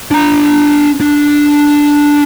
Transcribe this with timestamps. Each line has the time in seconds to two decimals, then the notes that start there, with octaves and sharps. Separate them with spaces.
0.11 D4 A#5
1.01 D4